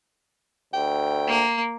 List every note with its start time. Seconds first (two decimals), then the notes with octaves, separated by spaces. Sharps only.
0.74 D2 G5
1.28 A#3